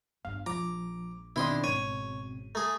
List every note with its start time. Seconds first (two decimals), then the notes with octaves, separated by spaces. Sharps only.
0.25 G1 G2 F5
0.46 A#1 F3 A#5 D6
1.36 B2 D#3 C4 D4 E4 C6 D#6
1.64 G#1 C#3 C#5 D#7
2.55 A3 G#4 A#5